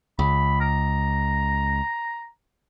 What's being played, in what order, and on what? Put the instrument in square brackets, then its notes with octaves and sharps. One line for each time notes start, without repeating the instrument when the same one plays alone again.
[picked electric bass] C#2 [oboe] B5
[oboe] A#5